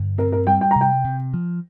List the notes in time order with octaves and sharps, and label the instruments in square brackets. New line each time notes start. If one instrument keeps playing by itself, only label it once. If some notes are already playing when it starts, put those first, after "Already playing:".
Already playing: [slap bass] G2 D3
[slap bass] C4 [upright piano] A#4
[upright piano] A#4
[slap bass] G3 [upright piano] G5
[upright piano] G5
[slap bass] C3 [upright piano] A#5
[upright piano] G5
[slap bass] C3
F3